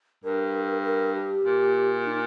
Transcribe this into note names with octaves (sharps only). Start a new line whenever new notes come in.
G2 A#4
A#4
G4
A#2
D#4